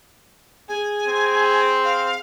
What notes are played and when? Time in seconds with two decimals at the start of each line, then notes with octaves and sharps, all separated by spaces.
0.68 G#4 G#5
1.08 C4
1.84 F5